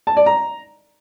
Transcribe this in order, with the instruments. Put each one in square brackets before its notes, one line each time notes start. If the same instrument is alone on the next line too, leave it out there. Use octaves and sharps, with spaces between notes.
[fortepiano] A5
D5
A#5